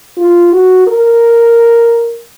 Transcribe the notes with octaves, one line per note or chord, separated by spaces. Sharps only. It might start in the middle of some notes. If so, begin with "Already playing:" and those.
F4
F#4
A#4